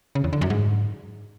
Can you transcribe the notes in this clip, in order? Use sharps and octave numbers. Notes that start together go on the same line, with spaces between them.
C#3
E2
D3
F#2
G#2